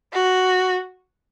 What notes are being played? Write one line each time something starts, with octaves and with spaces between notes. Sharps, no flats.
F#4